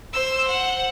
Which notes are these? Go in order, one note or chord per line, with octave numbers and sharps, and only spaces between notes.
C5 E6
F#5